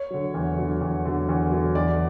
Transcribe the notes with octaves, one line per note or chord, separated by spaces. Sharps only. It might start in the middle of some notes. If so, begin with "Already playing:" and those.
Already playing: C#5
D3 F#3
E2
D3 F#3
E2
D3 F#3
E2
D3 F#3
E2 D5